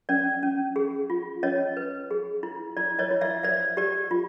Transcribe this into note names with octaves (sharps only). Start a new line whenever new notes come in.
C#4 D5
C#4
G#4
F4
C#4 C#5 D#5
B4
G#4
E4
E4 D5
C#5 D#5
E4
D5 E5
C5 D5 E5
G4 D5
F4